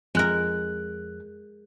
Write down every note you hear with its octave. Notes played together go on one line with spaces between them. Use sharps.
F2 G#3 A#4 F#6